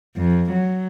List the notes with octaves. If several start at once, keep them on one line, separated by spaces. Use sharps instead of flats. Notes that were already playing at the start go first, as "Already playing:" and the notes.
F2
F#3